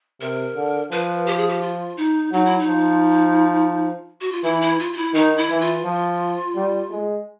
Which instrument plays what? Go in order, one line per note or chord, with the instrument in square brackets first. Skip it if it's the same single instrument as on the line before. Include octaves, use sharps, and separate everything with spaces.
[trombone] C3 [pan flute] A#4
[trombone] D3
[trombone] F3 [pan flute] B4
[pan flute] G4
G#4
G4
F4
D#4
[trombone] F#3 [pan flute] D#4
[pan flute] E4
D#4
[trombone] F3
[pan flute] F#4
F4
[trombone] E3 [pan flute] E4
[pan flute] E4
F4
F4
E4
[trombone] D#3 [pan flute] D#4
[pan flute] E4
[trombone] E3
[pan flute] F4
[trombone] F3
G3
G#3